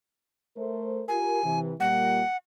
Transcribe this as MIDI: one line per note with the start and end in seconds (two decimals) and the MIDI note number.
0.57 1.03 57
0.57 1.03 70
0.57 1.03 72
1.08 1.44 65
1.08 1.44 67
1.08 1.44 70
1.08 1.59 80
1.44 1.73 48
1.44 1.73 52
1.80 2.21 46
1.80 2.21 55
1.80 2.21 58
1.80 2.37 78